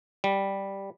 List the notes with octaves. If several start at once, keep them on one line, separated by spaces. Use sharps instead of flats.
G3